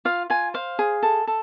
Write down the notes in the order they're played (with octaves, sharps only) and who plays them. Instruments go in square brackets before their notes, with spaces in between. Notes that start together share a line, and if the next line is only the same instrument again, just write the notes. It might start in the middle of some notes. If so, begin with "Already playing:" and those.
[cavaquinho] F4 F5
F4 G#5
C5 F5
G#4
A4
A4